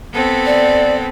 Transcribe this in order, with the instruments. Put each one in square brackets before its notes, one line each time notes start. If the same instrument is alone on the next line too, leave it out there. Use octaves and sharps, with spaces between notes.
[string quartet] B3 C4 A4
[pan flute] D5